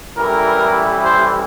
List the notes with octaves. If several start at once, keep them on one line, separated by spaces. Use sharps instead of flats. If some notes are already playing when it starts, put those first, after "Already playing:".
A1 A2 E3 G3 A#4
C5